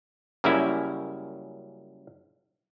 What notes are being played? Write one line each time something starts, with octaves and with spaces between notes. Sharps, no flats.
F#2 C#3 G3 A#3 C#4 E4